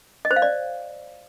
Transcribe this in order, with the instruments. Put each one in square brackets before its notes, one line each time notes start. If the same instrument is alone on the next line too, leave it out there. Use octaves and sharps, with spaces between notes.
[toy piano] D#5
C5
F5
D5